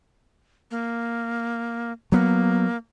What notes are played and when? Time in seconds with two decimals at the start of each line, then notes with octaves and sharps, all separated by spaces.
0.71 A#3
2.12 F#3 A#3 B3